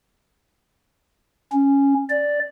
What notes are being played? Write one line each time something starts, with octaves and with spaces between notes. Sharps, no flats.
C#4
D5